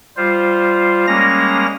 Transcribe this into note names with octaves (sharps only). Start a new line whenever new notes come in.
G3 F4 C5
G3 G#3 A#3 C#4 A#5 A#6